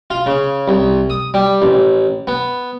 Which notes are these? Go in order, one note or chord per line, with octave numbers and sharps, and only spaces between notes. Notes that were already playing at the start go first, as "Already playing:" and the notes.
F4
C#3
C2
D#6
G3
A1
B3